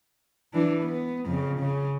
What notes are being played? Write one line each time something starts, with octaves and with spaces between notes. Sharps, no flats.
E3 D4
B3
F2 C#3
C#3